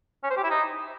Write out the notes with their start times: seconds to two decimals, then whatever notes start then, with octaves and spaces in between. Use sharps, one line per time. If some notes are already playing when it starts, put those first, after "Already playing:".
0.24 C#4
0.30 C5
0.37 G4
0.43 E4
0.50 D#4